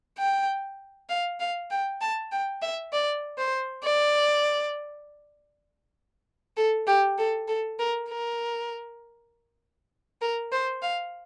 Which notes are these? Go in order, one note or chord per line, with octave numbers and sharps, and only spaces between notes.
G5
F5
F5
G5
A5
G5
E5
D5
C5
D5
A4
G4
A4
A4
A#4
A#4
A#4
C5
F5